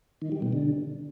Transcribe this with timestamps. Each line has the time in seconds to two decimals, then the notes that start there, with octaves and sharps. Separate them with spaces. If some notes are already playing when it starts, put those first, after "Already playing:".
0.22 D#3
0.32 G3
0.42 B2
0.53 D3